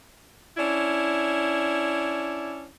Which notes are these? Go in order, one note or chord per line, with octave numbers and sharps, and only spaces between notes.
C#4 D4 E4